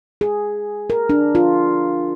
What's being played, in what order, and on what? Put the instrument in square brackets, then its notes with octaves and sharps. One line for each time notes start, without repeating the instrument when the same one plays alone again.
[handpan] G#4
A#4
D4
F4